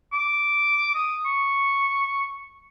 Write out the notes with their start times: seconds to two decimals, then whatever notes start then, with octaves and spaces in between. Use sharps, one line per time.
0.13 D6
0.95 D#6
1.26 C#6